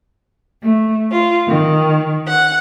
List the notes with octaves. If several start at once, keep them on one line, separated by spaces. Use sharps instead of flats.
A3
F4
D#3
F#5